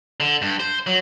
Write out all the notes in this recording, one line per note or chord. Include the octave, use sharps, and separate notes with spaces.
D3
G2
C5
F#3